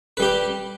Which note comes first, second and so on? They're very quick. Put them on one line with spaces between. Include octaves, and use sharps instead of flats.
B4 G3 G4